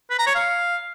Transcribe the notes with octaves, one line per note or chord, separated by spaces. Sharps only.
B4
A#5
C#5
F5